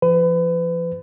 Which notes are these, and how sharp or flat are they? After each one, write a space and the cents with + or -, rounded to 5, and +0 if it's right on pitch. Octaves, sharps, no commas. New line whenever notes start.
F3 -35 B4 +30